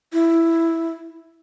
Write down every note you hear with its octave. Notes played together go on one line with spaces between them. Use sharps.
E4